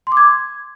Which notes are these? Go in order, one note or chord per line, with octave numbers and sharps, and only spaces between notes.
C6
D6
G#6